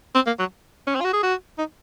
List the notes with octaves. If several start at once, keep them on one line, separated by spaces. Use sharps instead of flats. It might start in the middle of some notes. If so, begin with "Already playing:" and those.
C4
A#3
F#3
C#4
C4
F4
F#4
G#4
F#4
D#4